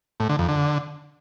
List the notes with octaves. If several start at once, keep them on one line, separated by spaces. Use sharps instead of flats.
A2
D3
F2
D3